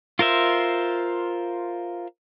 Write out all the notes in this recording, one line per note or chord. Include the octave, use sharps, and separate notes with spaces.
F4 A#4 C5 E5